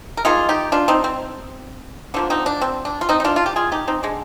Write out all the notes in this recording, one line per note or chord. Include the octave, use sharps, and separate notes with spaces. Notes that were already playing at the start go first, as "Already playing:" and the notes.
A#4
D#3 A#3 F4 G#4
D#4 G4
D4 F4
C4 D#4
C4
D3 F3 A#3 D4
C4 D#4
D4
C4
D4
F4
C4 D#4
D#4
D4 F4
F4
G4
F4 G#4
D#4 G4
C4 D#4
D3 G#3 D4